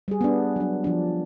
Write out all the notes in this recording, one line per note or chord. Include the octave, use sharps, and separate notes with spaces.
G3 G#4
B3 D4
F#3 D4
F3 D4